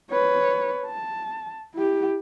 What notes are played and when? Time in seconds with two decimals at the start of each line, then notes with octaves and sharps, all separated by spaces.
0.11 B4 C#5
0.86 A5
1.74 E4 G4